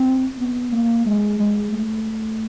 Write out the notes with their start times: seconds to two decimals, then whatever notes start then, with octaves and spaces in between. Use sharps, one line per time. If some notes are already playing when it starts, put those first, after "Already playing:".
Already playing: C4
0.39 B3
0.72 A#3
1.06 G#3
1.39 G#3
1.73 A3